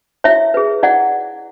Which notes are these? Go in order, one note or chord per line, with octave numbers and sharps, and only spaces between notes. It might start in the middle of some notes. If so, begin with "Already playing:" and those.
E4 C#5 E5
G#4 B4
E4 D5 F#5